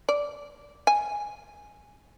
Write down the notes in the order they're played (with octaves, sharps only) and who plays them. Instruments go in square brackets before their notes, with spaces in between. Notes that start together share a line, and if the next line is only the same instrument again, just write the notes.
[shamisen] D5
G#5